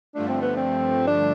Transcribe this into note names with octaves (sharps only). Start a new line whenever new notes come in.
G2 D3 F3 A3 D4
C4
B3
C4
D4